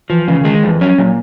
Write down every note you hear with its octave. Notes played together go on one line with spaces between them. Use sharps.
E3 F3
C#3 E3
D#3 G#3
D#3
F2 E3
F#3 C#4
A#2 F#3